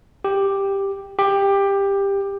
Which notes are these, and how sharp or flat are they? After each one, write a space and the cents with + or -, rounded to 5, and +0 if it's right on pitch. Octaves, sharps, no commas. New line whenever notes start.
G4 +5
G4 +15